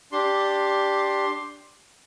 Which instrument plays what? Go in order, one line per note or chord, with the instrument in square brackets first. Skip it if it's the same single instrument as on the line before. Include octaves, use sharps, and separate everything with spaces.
[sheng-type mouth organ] D4 G4 C6